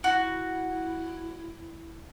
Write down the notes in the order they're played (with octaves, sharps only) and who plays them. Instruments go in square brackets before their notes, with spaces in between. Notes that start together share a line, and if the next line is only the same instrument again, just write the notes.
[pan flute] E4 [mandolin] F#4